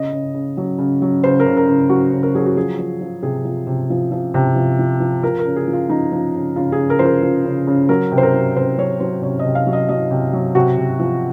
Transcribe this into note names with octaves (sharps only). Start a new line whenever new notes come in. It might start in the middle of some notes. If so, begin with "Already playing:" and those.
Already playing: C#3 D#5
C#3
C#3
F#3
C#3
F#3
C#3 C5
A#4
C#3
A#4
C#3
F#3 F#4
C#3
A#4
F#3 G#4
F#4
F3 G#4
F3
F3
C3 G#4
F3
C3
F3
F3
C3
F3
F3
F3
F3 A#4
A#4
C#3
G#4
F3
F4
F3 D#4
F3
C#3
C#3 F4
G#4
C#3
A#4
F3 C5
A#4
F3
C#3
C#3
F#3 A#4
C3
C5
A#4
F#3
C3 C5
F#3 C#5
F#3 C5
C3 C#5
D#5
C3
F5
F#3
D#5
F#3 D#5
C3
F#3
C3 F#4
C3
F3